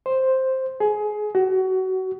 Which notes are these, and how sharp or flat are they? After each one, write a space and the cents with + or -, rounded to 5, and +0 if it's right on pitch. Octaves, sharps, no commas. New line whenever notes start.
C5 +5
G#4 +20
F#4 +25